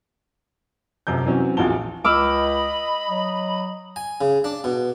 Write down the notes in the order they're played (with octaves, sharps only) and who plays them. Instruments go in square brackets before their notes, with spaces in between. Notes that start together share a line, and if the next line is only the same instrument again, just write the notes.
[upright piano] F1 F#2 C3 G6
E3 F#3 C4 C#4
A#1 E2 A#2 F#4 A5 G7
[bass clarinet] C#2 [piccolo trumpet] D#5 [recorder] B5 [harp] D6 E6 F6
[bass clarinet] F#3 [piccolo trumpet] D#5
[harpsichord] G#5
C#3
D4
B2